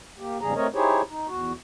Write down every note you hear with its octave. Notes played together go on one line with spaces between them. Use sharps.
A#3 G4
E2 G#2 C#3 G3 G#4 A#5
A3 C4 A#4 C#5 D#5
D#4 E4 G4 G#4 C5 C#5
D#4
E2 F#4